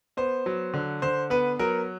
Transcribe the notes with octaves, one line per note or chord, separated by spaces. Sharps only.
B3 C5
F#3
D3
D3 C5
B3 B4
F#3 A#4